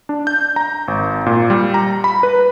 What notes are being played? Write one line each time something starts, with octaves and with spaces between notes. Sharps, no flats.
D4
G6
A#5
G#1
A#2
G3
A#5
B5
B4